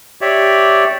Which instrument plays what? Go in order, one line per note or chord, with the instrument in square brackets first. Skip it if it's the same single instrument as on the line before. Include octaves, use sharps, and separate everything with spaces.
[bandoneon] G4 C#5 D5 E5